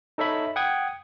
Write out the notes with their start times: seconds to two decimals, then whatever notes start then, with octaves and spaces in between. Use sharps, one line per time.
0.18 D#4 A4 C#5 E5 B5
0.56 F#5 G5 D#6 G#6